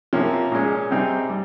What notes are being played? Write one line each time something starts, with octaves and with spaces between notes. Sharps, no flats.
C3 F3 A#3 C#4
A#2 G#3 C#4
C3 G3 C4 D#4 G#4
G3